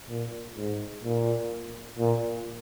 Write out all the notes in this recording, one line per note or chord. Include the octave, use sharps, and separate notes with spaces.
A#2
G#2
A#2
A#2